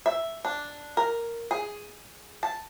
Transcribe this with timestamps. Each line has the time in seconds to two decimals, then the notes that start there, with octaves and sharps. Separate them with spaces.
0.06 E5
0.45 D4
0.97 A#4
1.51 G#4
2.43 A5